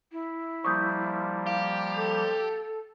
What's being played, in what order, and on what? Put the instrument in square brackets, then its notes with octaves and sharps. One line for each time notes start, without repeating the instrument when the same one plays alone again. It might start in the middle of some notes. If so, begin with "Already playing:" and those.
[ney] E4
[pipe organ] F3 G3 A#3 [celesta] C#6 D#6 G6
[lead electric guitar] G4 [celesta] F5
[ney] A4